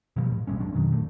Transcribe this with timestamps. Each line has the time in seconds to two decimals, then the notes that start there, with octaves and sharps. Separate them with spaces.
0.16 B2 F3 G3
0.32 A2
0.47 B1 G3 G#3 C#4
0.60 G2 F#3 C4 D4
0.74 F2 B2 D#3 F#3
0.92 G#1 A#2 A3